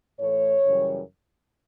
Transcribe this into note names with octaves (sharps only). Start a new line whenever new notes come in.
A2 E3 A3 C#5
F#2 C#3 E3 G3